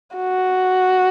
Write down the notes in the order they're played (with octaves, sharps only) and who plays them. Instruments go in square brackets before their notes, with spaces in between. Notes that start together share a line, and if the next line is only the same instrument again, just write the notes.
[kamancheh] F#4